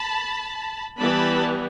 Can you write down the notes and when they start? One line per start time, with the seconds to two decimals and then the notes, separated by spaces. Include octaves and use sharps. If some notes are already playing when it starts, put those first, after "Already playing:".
Already playing: A5 B5
0.99 E3 G3 B3 A5 B5